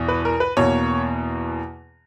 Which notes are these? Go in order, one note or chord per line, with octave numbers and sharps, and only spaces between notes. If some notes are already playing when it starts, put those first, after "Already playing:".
Already playing: E2 B2
B4
A#4
B4
E2 B2 A#3 C#5